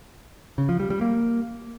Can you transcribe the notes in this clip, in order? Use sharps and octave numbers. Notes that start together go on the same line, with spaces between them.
C#3
F3
G3
G3
A#3